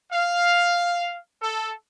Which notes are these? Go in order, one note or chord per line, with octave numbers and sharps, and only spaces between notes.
F5
A4